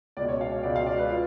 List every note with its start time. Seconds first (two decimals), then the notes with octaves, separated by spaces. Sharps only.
0.17 C#2 B2 D5
0.28 C#5
0.41 F5
0.52 F5
0.63 C#2 B2 D5
0.76 F5
0.87 D5
0.98 B4
1.10 F4